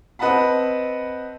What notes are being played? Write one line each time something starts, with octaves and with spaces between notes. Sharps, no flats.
C4 B4 D#5 F#5 A5 B5